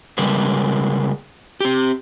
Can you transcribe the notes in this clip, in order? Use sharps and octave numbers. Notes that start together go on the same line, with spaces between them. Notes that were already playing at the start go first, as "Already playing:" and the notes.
C#3 G3 G#3 A#3 B4
C4 G4